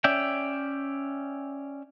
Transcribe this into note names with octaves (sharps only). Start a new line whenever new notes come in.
C#4 D5 E5 G5